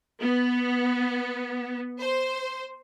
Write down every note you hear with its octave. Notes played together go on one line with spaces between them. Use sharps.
B3
C5